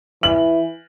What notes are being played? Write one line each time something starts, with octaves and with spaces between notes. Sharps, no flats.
E3 F#7